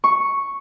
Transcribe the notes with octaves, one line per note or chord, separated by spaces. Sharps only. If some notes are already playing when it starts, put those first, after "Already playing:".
C#6